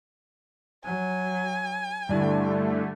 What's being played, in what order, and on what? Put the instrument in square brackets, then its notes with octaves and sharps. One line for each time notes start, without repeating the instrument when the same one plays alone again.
[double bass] F#3 [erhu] G#5
[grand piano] G2 D4 E4 [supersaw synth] D3 A3 [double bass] G3